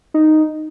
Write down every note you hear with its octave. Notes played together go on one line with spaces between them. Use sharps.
D#4